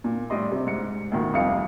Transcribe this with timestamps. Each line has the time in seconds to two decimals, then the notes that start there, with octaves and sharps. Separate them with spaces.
0.04 A#2
0.30 A2 G3 D5 D#5 C6
0.52 C3
0.67 G#2 C#7
1.12 D2 A#2 D#3
1.33 C2 F2 F4 F5 C#7